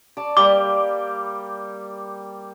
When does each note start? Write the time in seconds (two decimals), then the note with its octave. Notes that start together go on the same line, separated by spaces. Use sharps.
0.17 D5 A5
0.37 G3 A#3 D6